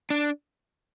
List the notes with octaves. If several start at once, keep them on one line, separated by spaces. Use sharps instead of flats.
D4